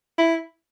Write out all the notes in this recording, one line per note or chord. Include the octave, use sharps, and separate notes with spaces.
E4